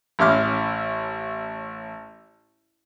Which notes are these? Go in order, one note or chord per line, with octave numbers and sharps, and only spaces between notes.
A1 C#4 E5 C6 D6 F6